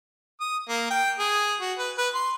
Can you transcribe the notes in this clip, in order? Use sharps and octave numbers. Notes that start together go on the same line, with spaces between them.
D#6
A#3
G5
G#4
F#4
B4
B4
C6